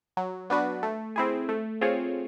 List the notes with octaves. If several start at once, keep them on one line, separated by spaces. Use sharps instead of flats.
F#3
B3 D4 F#4 B4
A3
C4 E4 G#4
A3
C4 F4 G#4 C#5